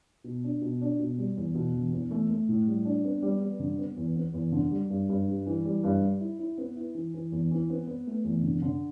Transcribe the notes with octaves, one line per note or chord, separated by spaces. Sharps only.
B2
D4
B2
D4
B2
G3
E2
B2
E1
E2
A3
A3
A2
G3
D4
B3
G3
G3
D3
B3
E2
B3
E2
D3
G3
G2
G2
G3
E3
G3
G2
G3
E4
E4
B3
E4
E3
E3
E2
E3
B3
B3
A3
E2
D3
D3